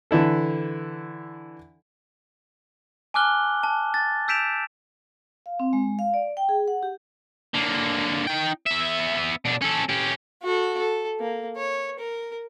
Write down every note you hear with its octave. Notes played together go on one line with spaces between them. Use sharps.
D3 E3 E4 A4
G#5 A5 D6 F6 F#6 G7
A5
A6
E6 G6 B6 D7 E7 F7
F5
C4
G#3
F5
D5
G5
G#4
F#5
G4
D3 A#3
D#4 G5
B3 E5
B2 D4
C#4 A4
C#4 G4
F#4 A4
A4
A#3
C#5
A#4